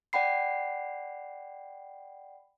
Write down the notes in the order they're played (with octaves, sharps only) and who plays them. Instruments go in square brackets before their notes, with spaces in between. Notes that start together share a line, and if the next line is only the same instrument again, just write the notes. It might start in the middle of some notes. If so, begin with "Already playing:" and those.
[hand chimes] D5 F#5 G5 B5 C7